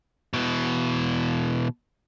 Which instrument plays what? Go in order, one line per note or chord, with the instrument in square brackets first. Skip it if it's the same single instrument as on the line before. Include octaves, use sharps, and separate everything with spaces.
[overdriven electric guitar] B2 E3